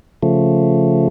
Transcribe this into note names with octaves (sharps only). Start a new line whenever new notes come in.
C#3 F3 A3